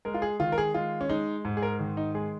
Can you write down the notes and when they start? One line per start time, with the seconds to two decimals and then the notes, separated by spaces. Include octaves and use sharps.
0.05 G#3 A#4
0.14 F4
0.22 G#4
0.40 D#3 F4
0.52 A#4
0.58 G#4
0.74 G#3 F4
1.01 C#4
1.09 G#3 D#4
1.45 G#2
1.57 G#4
1.62 A#4
1.79 D#3
1.97 D#4
2.14 G#3 G#4